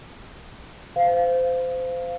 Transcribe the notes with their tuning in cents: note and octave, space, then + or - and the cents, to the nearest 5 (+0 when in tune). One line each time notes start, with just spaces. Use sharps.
C5 -25 F5 +0